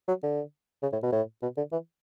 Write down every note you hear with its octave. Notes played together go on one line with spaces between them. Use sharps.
F#3
D3
C#3
A2
B2
A2
B2
D3
E3